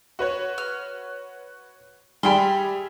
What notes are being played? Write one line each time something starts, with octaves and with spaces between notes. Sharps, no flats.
F#4 B4 C#5
F6
G3 G#4 E5 G5 B5 C6